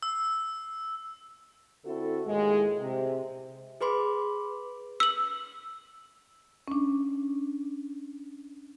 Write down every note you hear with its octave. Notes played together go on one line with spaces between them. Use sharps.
E6
D3 C4 E4 F#4 A4
D#2 A2 G#3
C3
G#4 B4 B5 C6 D6
E6 F#7
C#4 D4